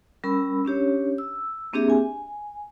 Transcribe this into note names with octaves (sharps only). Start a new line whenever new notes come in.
G3 C#4 A#4 B5 E6
C#4 D4 G4 C#5
E6
A#3 C4 D4 G4 G#4 E5
G#5